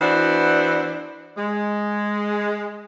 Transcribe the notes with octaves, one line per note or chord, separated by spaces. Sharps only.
E3 B3 D4 F#4 C5
G#3